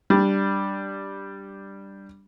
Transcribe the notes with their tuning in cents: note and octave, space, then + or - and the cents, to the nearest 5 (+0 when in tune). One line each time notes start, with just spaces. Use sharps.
G3 +0 D4 +0